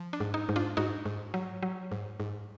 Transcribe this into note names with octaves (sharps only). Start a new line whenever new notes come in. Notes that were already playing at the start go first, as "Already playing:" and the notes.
Already playing: F3
D4
G#2
D#4
G#2
D4 F4
G#2 D#4 F#4
G#2
F#3
F#3
G#2
G#2